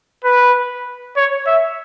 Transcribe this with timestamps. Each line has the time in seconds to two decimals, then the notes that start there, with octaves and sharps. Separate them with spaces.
0.24 B4
1.17 C#5
1.47 E5